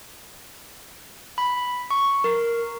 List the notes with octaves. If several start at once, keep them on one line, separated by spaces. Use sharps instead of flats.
B5
C#6
A#4